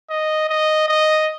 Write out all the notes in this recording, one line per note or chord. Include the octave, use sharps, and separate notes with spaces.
D#5
D#5
D#5